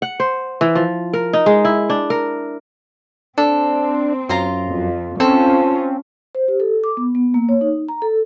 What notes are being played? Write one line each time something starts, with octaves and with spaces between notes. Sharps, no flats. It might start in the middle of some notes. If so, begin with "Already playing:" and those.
F#5
C5
E3
F3
A#4
D#4
G#3
E4
D4
A#4
C4 D4 A4
F#2 F4 A#5 C6
F2
C4 C#4 F4 A4
C5
G4
A4
D6
B3
B3
A#3
C#5
D#4
A#5
A4